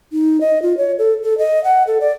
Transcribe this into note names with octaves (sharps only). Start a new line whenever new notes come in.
D#4
D#5
F4
C#5
A4
A4
D#5
F#5
A4
D5